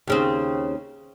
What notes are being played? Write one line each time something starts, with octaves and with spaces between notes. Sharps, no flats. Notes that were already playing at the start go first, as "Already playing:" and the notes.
D#2 C#3 C4